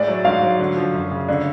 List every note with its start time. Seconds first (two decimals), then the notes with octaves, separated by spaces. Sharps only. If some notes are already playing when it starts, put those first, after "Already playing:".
Already playing: A2 G#3 D5
0.08 F#3
0.25 G#2 F5
0.42 F#3
0.60 D3
0.77 F3
0.93 F#2
1.11 C#3
1.28 D3 D5